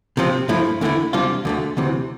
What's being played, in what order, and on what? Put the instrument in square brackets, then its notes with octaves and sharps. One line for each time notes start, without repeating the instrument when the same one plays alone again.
[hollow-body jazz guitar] C3 F3 C4
G2 F3 A3 E4
E2 D3 A3 E4
E2 C3 G3 D4 F4
D2 D3 A3
D2 C3 E3